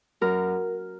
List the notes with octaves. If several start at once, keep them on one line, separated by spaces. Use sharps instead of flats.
F#2 A#4